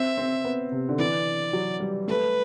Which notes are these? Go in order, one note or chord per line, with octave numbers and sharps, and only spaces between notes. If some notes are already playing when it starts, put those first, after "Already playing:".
Already playing: C4 E5
C4
B3
C3
D3
E3 D5
F#3
G3
A3 B4